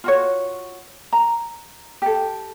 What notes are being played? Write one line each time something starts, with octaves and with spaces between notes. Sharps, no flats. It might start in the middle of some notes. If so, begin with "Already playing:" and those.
F4 F#4 C#5
A#5
G4 A4